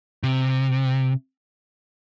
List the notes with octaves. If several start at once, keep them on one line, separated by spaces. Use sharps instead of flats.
C3